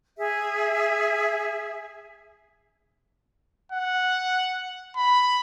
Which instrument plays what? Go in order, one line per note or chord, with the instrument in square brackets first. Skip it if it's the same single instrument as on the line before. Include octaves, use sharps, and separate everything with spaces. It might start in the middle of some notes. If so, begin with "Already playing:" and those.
[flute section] G#4 E5
[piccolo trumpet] F#5
B5